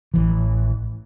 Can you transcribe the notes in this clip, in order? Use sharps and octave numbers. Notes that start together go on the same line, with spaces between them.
A1 E3